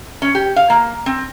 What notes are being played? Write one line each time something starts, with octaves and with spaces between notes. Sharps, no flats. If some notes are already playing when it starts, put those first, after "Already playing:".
C#4
G4
F5
A#3
C4